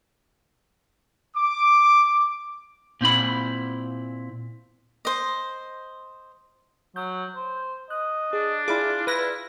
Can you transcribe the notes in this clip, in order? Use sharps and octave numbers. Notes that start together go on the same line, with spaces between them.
D6
A#2 C4 E4 B5
C5 D#5
F#3 G6
C5
D#5 F#6
D4 G#4
E4 F4 G#4 D5 D6
E4 B4 A#6